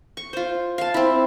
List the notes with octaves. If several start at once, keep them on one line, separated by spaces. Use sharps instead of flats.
C#6
F4 C5
F5 A5
C4 E4